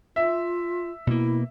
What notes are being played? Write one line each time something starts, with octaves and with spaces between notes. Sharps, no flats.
F4 E5
B2 A#3 E4